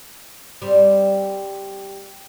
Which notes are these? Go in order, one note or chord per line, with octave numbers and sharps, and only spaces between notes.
G3 C4